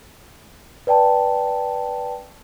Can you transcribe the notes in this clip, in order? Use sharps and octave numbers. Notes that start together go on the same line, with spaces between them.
B4 D5 G5 A5